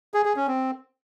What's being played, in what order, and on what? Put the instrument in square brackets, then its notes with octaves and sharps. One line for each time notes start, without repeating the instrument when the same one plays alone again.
[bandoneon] G#4
G#4
C#4
C4